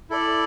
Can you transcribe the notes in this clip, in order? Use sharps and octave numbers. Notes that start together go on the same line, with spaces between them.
E4 A4 D5